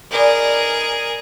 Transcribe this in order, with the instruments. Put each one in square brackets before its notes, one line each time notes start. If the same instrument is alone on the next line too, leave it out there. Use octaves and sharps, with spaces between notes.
[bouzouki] D#4 B4 D5 [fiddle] G#4 A#4